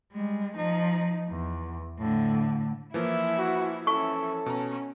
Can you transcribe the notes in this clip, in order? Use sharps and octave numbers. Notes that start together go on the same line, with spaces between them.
G3 G#3
F3 D#4
E2
A2 D3
E3 F3 A#3 E4
F#4
C#4 E4 A4 C#6
B2 C#4 A#5